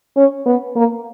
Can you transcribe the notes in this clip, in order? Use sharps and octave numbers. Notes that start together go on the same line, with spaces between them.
C#4
B3
A#3